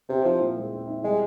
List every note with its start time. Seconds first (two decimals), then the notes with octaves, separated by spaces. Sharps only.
0.09 C3 C4
0.25 F3 E4
0.41 A#2
0.56 G#3
0.72 C4
0.87 E4
1.04 G3 G#3